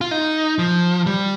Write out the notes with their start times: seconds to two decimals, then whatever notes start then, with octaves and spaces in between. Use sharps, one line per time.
0.01 F4
0.11 D#4
0.59 F3
1.06 G3